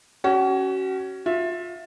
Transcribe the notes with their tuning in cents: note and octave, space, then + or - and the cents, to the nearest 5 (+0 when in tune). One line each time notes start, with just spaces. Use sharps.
C#4 +0 F#4 +35
F4 +25 E5 +0